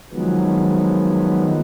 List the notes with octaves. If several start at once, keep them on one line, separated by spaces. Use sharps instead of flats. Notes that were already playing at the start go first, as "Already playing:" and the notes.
D#3 F3 F#3 G#3 B3